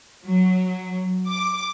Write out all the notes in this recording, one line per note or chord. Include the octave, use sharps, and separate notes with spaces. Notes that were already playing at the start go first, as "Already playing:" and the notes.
F#3
D6